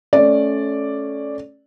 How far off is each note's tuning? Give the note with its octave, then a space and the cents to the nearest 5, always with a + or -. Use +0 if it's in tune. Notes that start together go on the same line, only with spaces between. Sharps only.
A3 -15 C#4 +0 D5 +0